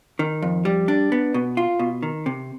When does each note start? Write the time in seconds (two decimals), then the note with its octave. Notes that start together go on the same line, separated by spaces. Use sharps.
0.19 D#3
0.42 F2
0.65 G3
0.88 D4
1.12 B3
1.34 B2
1.57 F4
1.79 B2
2.03 D#3
2.26 C3